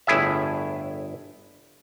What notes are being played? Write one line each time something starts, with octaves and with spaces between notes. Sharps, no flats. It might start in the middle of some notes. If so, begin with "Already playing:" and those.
G1 A2 E4 G#4 E5